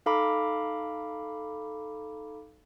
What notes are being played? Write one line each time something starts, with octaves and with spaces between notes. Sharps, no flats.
D#4 A4 F5 A#5 B5 D6